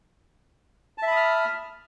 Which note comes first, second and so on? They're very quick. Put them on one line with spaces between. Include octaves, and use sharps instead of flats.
A5 E5 B5 D#6 F6